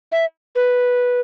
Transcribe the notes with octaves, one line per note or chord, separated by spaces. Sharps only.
E5
B4